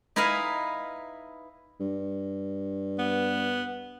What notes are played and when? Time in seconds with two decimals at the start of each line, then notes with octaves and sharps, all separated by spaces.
0.16 D#4 E4 B4 D#5 F5 G#5
1.80 G2
2.99 B3